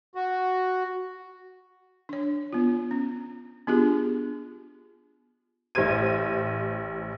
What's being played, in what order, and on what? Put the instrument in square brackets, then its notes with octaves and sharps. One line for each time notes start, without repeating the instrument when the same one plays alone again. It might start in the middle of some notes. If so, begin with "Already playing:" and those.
[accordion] F#4
[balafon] D4 C#5
B3 F4
C#4
B3 D4 F4 G4 G#4
[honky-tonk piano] A1 G4 C5 G#6 D#7